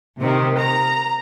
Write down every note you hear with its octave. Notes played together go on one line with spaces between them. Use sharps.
C3 D#3
A#5